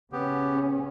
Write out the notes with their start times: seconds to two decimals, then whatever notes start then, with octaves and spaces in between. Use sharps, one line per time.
0.12 C#3 B3 C#4 G4